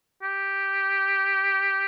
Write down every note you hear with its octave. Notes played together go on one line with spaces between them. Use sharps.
G4